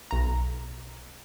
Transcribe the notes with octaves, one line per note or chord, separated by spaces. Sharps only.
B1 A#5